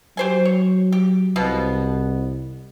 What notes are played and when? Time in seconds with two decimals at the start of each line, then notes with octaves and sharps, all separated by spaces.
0.17 F#3 G4 C5 G#5
0.45 C#5
0.92 G4
1.36 C2 B2 F3 B3